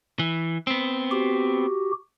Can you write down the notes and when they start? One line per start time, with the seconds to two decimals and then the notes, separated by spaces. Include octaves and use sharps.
0.19 E3
0.67 B3 C4
1.11 F#4 G4